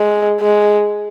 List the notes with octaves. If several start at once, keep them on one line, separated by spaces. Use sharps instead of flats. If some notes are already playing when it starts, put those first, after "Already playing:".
Already playing: G#3
G#3